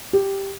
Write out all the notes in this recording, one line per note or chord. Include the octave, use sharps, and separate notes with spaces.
G4